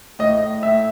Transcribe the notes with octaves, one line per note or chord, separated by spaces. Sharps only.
A2 D#5
A2
A2 E5